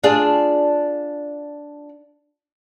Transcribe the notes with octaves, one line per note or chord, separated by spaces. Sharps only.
D4 F4 G#4